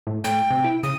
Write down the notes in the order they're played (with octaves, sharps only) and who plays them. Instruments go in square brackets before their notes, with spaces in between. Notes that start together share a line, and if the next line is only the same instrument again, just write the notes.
[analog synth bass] A2
[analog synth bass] A2 [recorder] G5
[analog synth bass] C3
E4
[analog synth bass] C#3 [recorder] D#6